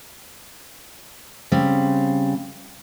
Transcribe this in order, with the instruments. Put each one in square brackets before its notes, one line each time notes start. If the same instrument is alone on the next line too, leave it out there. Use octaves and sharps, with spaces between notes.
[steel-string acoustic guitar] C#3 G3 C4